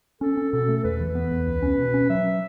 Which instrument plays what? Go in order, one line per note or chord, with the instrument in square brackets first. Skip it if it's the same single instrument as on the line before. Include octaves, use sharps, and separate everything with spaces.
[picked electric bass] C#4 [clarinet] A4
[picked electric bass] C#4
[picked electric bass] B2 [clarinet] A4
[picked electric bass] A3
[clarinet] A4
[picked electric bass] E2 [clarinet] B4
[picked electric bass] E3
B3
E2
C#2
C#4
B2
C#4
[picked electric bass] F#3 [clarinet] E5